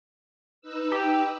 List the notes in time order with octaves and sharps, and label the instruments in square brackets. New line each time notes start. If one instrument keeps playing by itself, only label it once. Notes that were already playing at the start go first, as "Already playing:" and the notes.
[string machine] D#4 B4 E6
[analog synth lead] G4